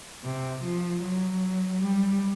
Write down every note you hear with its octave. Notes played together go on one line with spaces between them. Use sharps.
C3
F3
F#3
G3